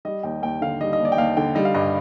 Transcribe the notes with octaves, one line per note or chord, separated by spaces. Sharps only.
G3 D#5
D#2 G5
D#2 G5
D3 F5
G3 D#5
D#5
D#2
D5
G5
D#2 F5
D3 G5
G3 D#5
F5
G2 D#5